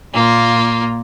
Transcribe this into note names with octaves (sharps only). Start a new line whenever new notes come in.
A#2 A#3 F4